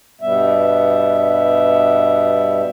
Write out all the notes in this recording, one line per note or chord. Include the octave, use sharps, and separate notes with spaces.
G2 B2 G3 B3 E5